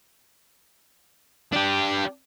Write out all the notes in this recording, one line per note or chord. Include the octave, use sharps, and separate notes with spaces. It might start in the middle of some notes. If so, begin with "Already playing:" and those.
D4 G4